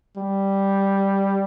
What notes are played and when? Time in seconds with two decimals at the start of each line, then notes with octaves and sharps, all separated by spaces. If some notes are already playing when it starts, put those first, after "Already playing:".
0.18 G3